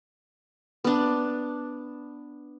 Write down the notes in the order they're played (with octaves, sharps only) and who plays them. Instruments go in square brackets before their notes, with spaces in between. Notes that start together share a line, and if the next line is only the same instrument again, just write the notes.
[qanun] B3 D4